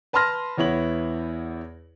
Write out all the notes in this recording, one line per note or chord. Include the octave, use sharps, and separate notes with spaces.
B4 A5 B5 C6 F6 A#6
E2 B3 E4 C#5 F#7